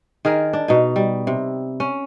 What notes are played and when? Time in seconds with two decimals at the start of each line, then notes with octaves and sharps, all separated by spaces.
0.25 D#3 G#4 A#4
0.53 D4
0.68 B2 D#4
0.96 G3
1.27 C3
1.80 C#4